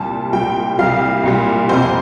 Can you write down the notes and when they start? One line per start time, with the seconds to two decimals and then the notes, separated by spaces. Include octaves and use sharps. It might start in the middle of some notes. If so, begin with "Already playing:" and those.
Already playing: C2 A#2 G3 A5
0.32 C2 A#2 G3 G5
0.79 C2 A#2 G3 F5
1.23 C2 A#2 G3
1.69 F1 F2 C3 C5